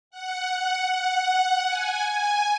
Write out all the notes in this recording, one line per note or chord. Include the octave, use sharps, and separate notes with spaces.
F#5
F#5
F#5
G#5
G#5